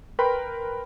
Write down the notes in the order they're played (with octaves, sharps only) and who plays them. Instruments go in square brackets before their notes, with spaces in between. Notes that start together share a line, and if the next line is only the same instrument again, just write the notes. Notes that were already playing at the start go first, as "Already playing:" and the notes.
[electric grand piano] A#4 B4 G5 B5 C6